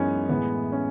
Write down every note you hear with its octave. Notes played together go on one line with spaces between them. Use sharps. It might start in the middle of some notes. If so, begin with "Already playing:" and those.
Already playing: F#2 E3 G#3 B3 C#4 D#4
A2 E3 G#3 B3
C#4